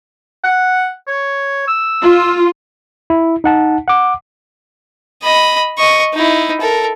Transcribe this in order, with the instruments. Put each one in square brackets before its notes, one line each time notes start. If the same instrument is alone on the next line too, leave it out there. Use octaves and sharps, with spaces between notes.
[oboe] F#5
C#5
E6
[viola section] F4
[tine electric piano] E4
D#4 F#5 A5
F#5 D6
[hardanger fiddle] D#5 B5
D#5 C#6
D#4 E4
A4 A#4